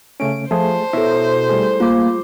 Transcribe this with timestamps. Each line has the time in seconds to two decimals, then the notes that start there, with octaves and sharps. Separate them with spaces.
0.20 C#3 A3 C#4 D7
0.51 F3 A3 G#4 C5 A5
0.93 B2 E4 A4 C#5 E5
1.49 G3 A3 G#4
1.80 A#3 F4 D6